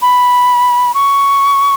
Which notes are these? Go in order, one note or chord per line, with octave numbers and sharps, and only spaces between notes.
B5
C#6